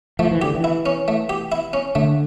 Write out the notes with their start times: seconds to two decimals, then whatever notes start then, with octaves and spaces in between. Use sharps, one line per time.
0.19 F3 A3
0.31 E3
0.42 D3 G4
0.55 E3
0.64 E4
0.86 C#4
1.08 A3
1.29 G4
1.52 E4
1.73 C#4
1.95 D3 A3